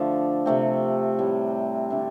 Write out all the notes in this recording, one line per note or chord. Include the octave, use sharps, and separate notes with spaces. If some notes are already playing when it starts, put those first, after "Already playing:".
Already playing: D3 F3 A3 D4
C3 A3 C4
A2 G3 C4
D3 A3 D4